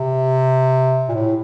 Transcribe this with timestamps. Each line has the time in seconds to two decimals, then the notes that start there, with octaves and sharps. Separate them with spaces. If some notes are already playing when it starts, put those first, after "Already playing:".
Already playing: C3
1.09 A#2
1.14 A2